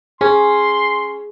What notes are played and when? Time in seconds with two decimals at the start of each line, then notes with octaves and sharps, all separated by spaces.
0.21 C#4 G#4 C6